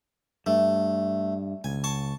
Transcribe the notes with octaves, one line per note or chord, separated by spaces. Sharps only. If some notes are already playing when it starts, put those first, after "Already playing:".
G2 A3
C#2 G#5
A5 C#6